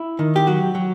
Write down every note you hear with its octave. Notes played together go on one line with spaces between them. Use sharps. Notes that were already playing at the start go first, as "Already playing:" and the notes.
Already playing: E4
D#3
G4
F#3 F#4
F#3